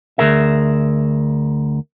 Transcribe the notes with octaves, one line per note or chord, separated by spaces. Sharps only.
D2 G2 G#4 A#4 E5